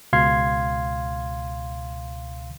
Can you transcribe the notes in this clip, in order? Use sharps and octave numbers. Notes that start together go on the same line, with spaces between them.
C#2 B2 F5 C6 G#6 C7